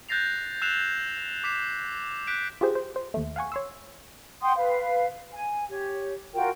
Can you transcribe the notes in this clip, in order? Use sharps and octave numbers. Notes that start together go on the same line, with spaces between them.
F#6 G6 A6 A#6 C7 F7
E6 F#6 G#6 C7 E7 F7
D6 B6 C7 E7
F#6 G6 B6 D7
F4 G4 G#4 C5
C5
C5
D#2 A3
F5 F#5 G#5 C#6
C#5 C6 E6
F#5 G5 C6 D#6
B4 F5
G#5
G4 C#5
F4 F#4 A#4 G5